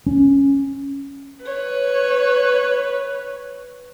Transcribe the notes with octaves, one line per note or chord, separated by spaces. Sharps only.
C#4
B4 C#5